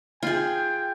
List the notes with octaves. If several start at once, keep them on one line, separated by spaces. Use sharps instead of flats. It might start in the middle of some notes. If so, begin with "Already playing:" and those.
F4 G#4 G5